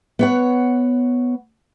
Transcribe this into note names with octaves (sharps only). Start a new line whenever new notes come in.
B3 C#5 F#5